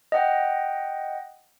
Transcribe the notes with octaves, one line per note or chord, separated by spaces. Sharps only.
D#5 F#5 G5